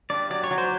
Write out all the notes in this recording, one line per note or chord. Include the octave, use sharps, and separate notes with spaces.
G2 D5
F#3 D5
C#5
F#3
C5